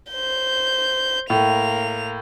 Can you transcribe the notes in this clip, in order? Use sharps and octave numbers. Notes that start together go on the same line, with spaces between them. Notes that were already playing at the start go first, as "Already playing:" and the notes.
C5 G6
A2 A#3 F7